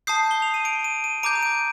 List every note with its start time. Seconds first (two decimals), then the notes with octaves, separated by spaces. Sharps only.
0.07 A5 D#6 G6 C7
0.31 G7
0.42 F7
0.54 D#7
0.65 D7
0.84 D#7
1.04 D#7
1.23 A#5 D6 G6 D7
1.36 D#7
1.43 D7